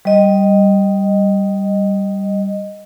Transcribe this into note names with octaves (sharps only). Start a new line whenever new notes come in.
G3 D#5